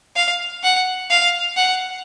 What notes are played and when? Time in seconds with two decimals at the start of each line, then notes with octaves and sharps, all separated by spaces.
0.16 F5
0.63 F#5
1.10 F5
1.56 F#5